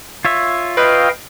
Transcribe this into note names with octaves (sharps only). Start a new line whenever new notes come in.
F4 C#5 E5
B4 D#5 F5 G5